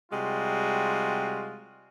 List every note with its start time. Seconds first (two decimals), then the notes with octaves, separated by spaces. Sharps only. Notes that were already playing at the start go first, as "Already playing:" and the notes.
0.11 C3 G3 G#3 F4 F#4